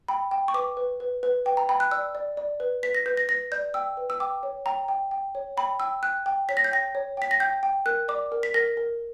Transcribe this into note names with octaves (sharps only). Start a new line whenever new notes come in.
G5 B5
G5
C#6
B4 D6
B4
B4
B4
B4 G5
A#5
G5 B5
F#6
D5 E6
D5
D5
B4
B4 B6
A#6
B4 G6
A#6
B4 A#6
D5 G6
G5 E6
B4
E6
G5 D6
C#5
G5 A#5
G5
G5
C#5
G5 B5
G5 E6
G5 F#6
G5
C#5 B6
A#6
G6
G5 A#6
C#5
G5 B6
A#6
G5 G6
G5
A#4 F#6
D5 D6
A#4
B6
A#4 A#6
A#4